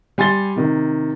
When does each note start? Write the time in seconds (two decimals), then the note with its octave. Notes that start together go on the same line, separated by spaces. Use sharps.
0.18 G3 G#5 C6 A6 G7
0.56 C3 D#3